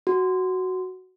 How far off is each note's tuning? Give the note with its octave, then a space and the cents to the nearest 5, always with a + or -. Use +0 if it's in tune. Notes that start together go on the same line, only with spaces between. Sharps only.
F#4 +5